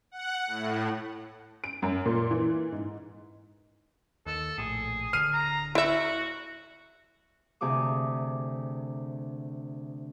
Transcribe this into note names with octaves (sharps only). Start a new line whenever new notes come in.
F#5
A2
D7
F#2
A#2
E3
G#2
D#2 A4
A#1 A2 G#4
D1 D3 F6 C7 D#7
A#5
E4 F#4 E5
D2 C3 G#4 D6 D#6